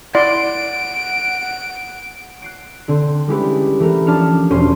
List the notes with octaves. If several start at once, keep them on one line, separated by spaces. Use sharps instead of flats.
E4 D5 F#5 C6 D7
F#6 C7 D7
D3 C4
G3 G#3 C#4 E4 G4 B4
E3 A3 A#4
F3 C#4 D4 A5 F6 C#7
E1 C#4 C5 C6 D#7